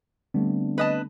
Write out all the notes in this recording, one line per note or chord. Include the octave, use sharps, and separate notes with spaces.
D3 G3 A3 B3 C4 D4
B4 D#5 A5